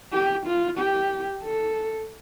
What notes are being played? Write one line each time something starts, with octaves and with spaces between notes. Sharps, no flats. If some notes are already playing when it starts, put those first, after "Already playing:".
G4
F4
G4
A4